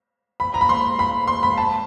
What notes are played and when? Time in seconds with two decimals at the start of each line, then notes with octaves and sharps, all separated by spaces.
0.40 B5
0.54 A#5
0.61 B5
0.69 C6
0.99 B5
1.27 C6
1.43 B5
1.58 A5